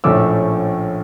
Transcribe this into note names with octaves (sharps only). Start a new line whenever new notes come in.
A#1 A2 F3 A3 C#4 D6 E6